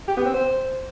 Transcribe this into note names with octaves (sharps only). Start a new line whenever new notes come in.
G4
B3
C4
C5